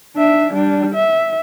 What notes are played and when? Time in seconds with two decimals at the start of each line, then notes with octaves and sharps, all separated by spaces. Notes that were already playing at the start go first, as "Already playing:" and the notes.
0.17 D4 E5
0.53 G3 D4
0.95 E5